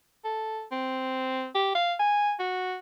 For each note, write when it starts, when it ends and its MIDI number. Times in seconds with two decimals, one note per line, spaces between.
0.25 0.63 69
0.72 1.47 60
1.55 1.71 67
1.75 1.94 77
2.00 2.33 80
2.40 2.76 66